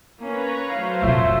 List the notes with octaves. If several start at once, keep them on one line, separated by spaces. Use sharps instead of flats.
A#3 C#4 B4 C#5 A#5
F#3 A3 C5 F5
F1 A#2 F4 E5